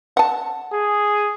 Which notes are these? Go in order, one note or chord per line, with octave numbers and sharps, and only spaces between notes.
F#5 A5
G#4